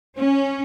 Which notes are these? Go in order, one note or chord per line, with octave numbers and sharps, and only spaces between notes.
C#4